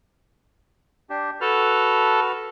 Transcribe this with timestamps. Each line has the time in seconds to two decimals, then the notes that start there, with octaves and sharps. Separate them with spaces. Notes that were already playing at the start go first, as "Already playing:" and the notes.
1.10 D4 G4
1.41 F#4 A4 B4 F6